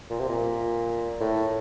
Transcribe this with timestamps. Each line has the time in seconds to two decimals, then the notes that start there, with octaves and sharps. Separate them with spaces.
0.10 A#2
0.19 C3
0.29 A#2
1.20 A2